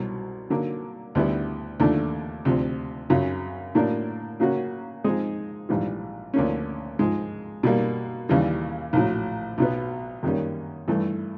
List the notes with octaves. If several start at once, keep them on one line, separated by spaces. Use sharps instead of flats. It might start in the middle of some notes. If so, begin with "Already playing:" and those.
Already playing: C2 B2 F#3
D3 F#3 A#3
D2 D3 G3 B3 E4
D#2 D3 F3 A3 D4
D2 C3 F3
F#2 C#3 F#3
A2 F#3 A#3 D4
C#3 F#3 A#3 C#4 F#4
F3 G#3 C4 D#4 G#4
A#1 G#2 E3 G3
D2 D3 F3 A#3 C#4
G#2 F3 G#3
B2 G3 A#3
D#2 C#3 E3 G3
A#1 A2 F#3
B1 B2 F#3 B3
F#2 D#3 G3 A#3 C#4
G2 E3 A3